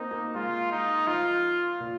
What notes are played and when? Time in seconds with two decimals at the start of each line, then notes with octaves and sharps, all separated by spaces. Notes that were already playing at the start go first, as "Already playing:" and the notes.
Already playing: A#3 C4 D#4
0.11 A#3
0.35 G#3 F4
0.72 D#4
1.07 F3 F4
1.80 A#2